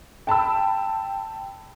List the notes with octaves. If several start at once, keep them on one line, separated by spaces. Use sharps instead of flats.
G5 A5 B5 E6